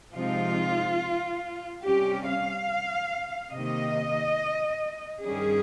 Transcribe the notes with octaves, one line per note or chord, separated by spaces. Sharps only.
C3 F3 G#3 C4 D#4 F4
C3 G3 C#4 G4
F5
C3 D#3 A#3 D#5
G2 D#3 G3 C#4 G#4